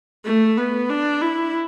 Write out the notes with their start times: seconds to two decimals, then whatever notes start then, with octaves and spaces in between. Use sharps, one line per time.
0.26 A3
0.58 B3
0.90 D4
1.22 E4